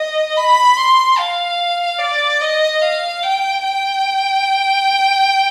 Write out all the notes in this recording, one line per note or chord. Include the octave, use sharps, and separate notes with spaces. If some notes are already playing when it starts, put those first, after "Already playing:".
Already playing: D#5
B5
C6
F5
D5
D#5
F5
G5
G5